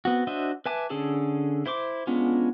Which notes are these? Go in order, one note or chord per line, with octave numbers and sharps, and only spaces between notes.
B3 C4 F#4
D4 F#4 C5 D#5 E5
B4 E5 G#5 A5 D6
D3 C#4 G#4 A4 A5
E4 C5 C6 D6
G#3 B3 C#4 D4 F4